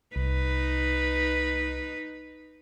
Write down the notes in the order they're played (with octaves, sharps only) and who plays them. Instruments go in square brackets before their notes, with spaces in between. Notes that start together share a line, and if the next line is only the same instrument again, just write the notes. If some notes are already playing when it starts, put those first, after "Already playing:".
[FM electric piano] C2 [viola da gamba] D#4 B4